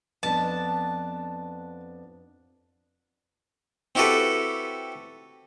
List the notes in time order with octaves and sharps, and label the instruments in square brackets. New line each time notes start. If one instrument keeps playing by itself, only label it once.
[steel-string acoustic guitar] F2 B3 D4 [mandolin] A5
[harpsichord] C4 E4 F#4 G4 A4 B4